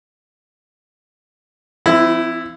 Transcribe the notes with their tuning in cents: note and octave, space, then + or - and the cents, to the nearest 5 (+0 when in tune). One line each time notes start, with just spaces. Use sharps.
F3 -40 C4 -35 E4 +0